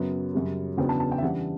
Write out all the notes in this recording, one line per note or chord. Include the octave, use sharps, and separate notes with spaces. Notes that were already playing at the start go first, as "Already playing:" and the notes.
Already playing: F#2 C#3 F#3 B3
F#2 C#3 G3
E2 C#3 F#3 B3 D4 G5
A5
A5
G5
E5
C#3 E3 G3 D4 F#5